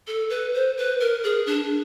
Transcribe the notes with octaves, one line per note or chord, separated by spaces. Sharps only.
A4
B4
C5
B4
A#4
G#4
D4